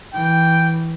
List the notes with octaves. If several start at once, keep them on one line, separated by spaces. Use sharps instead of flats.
E3 G5